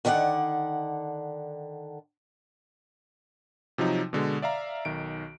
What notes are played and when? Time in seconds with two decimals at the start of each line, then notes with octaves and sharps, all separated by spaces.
0.05 D3 D#3 D5 E5 F#5
3.78 C3 F3 F#3 D#4
4.13 B2 D3 G#3
4.42 D5 E5 F5 A#5
4.85 B1 D#3 D7